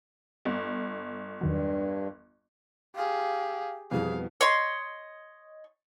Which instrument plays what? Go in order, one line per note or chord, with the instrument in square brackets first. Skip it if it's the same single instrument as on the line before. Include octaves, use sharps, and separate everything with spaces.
[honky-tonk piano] G1
[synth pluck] E2 D#3 F#3 [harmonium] G2
[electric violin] G4 G#4 [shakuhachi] F5
[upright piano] F2 [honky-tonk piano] B2 E3 G3 [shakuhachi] G#4 [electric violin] F5
[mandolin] C#5 D#5 C6